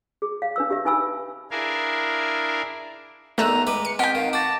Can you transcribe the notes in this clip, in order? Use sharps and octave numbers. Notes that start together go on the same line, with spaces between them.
G#4
F5
D4 B4 E6
G4 E5
D#4 B4 G#5 B5 E6
D4 E4 G#4 A#4 F5 G#5
E2 D#3 A3 A#5 E6 F#6
G#3 B4 D6
C#7
C4 F4 D#5 F#5 G5 B6 D7
D#3 F5
F#4 A5 D6 A6 A#6